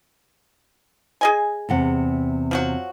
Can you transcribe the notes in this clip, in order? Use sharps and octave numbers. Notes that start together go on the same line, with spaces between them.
G#4 D#5 G#5
E2 C3 F#5
F3 F#3 F#4